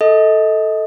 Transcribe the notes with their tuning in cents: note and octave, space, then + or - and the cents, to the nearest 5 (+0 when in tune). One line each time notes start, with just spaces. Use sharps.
A4 +0 D#5 +30